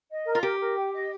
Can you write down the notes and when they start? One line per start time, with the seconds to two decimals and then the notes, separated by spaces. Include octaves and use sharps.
0.10 D#5
0.27 A#4
0.35 F4
0.42 G4 A#4
0.60 A#4
0.76 G5
0.93 D#5